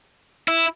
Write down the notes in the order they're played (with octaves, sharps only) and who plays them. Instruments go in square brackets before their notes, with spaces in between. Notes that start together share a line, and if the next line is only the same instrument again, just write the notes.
[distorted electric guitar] E4